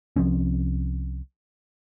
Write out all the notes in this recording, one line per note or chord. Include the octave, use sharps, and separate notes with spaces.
C2 F3 C4 C#4